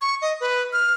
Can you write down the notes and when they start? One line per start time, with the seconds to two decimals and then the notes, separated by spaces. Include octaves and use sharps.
0.01 C#6
0.22 D#5
0.41 B4
0.73 F6